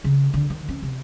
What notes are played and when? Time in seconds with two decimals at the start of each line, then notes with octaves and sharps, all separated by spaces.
0.04 C#3
0.34 D3
0.50 D#3
0.69 C#4
0.83 C3